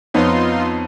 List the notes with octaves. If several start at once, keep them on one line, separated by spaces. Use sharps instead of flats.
F2 B3 D#4 F4 C#5 C6